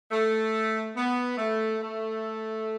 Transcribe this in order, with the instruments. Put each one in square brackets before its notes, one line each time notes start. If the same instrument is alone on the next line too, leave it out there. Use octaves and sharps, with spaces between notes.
[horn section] A3
B3
A3
A3